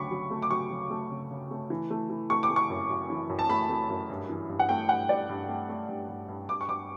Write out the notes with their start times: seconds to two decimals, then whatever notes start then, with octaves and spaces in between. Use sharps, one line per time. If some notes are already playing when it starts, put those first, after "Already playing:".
Already playing: D2 C#3 F#3 B5 C#6 D6
0.11 F#3
0.31 A3
0.42 D6
0.51 F#3 C#6
0.70 F#3
0.90 A3
1.11 C#3
1.31 C#3
1.51 A3
1.70 E3
1.90 A3
2.10 E3
2.30 A3 C#6
2.43 D6
2.50 A3
2.56 C#6
2.70 F#2
2.90 F#2
3.10 E3
3.29 F#2
3.39 A5
3.49 A3 B5
3.69 A3
3.90 F#2
4.10 G2
4.29 E3
4.49 G2
4.59 F#5
4.69 A3 G5
4.89 G2 F#5
5.09 G2 D5
5.29 G2
5.49 A3
5.69 A3
5.89 G2
6.09 G2
6.29 G2
6.48 G2 D6
6.61 C#6
6.68 G2 D6